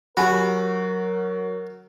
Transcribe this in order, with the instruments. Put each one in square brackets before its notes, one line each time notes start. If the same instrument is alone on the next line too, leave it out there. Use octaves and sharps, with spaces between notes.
[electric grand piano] F#3 [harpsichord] F#4 [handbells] G4 G#5 B5 [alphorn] A#4